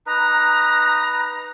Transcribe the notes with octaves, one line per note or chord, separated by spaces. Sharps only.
D#4 B4 A#5